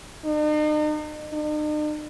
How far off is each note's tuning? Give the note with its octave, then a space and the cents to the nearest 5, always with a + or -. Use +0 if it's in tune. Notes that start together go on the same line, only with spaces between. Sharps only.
D#4 -45
D#4 -45